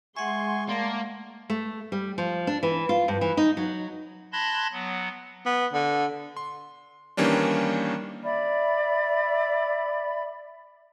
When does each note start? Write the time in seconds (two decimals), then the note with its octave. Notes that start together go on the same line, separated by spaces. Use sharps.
0.17 G#3 E5 F#5 G#5 C6 C#6
0.68 A3 A#3 D5 A5
1.50 A3
1.92 G3
2.18 F3
2.47 D4
2.63 E3
2.89 F4
3.08 G2
3.21 E3
3.37 D#4
3.57 F#3
4.32 A5 B5 C6 F#6 G#6 A#6
4.72 F#3 B3
5.46 B3
5.73 D3
6.37 C6
7.17 D#3 E3 G3 A#3 C#4 D4
8.23 D5 E5 B5